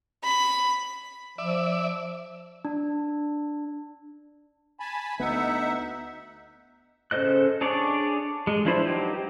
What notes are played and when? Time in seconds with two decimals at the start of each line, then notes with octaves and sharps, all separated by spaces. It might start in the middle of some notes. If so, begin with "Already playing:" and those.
0.23 B5
1.38 F3 D5 E5
2.65 D4
4.80 G#5 A5 B5
5.20 D2 B3 D#4 E5 F#5
7.11 C#3 A4 C5 D#5 F#6
7.61 D4 G#4 C#5 D5
8.47 G#3
8.65 F3 D4 E4 B4 C5
8.87 F#3 D#4 G4